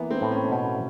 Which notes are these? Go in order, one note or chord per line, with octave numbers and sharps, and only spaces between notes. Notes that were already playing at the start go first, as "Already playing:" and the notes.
Already playing: E3 A#3 B3
C4
A2
C#4
B2 C#4